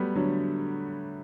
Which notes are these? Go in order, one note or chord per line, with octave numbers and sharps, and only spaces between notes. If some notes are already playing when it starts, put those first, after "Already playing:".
Already playing: F#3 G3 A3 B3
D3 F#3